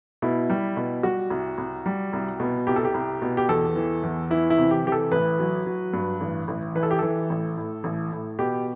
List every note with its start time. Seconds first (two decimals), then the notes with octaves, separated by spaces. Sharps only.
0.22 B2 E4
0.50 G3
0.77 B2
1.03 G3 F#4
1.30 C2
1.58 C2
1.86 G3
2.13 C2
2.40 B2
2.67 C2 G4
2.76 A4
2.85 G4
2.94 C2
3.22 B2
3.37 G4
3.49 E2 A4
3.76 E3
4.03 E2
4.30 E3 E4
4.50 E4
4.58 C3
4.71 G4
4.85 E3 G4
4.92 A4
5.12 A1 B4
5.39 F#3
5.66 F#3
5.93 G2
6.21 A1
6.48 A1
6.75 E3 B4
6.83 A4
6.91 G4
6.99 E3 A4
7.30 A1
7.57 A2
7.84 A1
8.12 A2
8.39 B2 G4